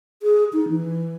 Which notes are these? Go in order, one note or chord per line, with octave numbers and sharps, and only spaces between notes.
G#4
D#4
E3